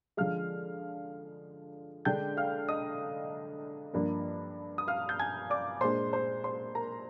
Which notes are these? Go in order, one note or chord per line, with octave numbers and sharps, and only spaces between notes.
D3 F3 G#3 F5 F6
D3 G#3 D4 G5 G6
F5 F6
D#5 D#6
G2 F3 A#3 D4
D#6
F5 F6
G6
G#5 G#6
D5 D6
A#2 G#3 D4 C5 C6
C5 C6
C5 C6
A#4 A#5